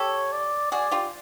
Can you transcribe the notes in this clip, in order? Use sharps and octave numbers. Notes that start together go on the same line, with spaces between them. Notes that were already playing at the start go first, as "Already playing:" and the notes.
Already playing: G4 A4 C#5
D5
F#4 G#4 D5
F4 G4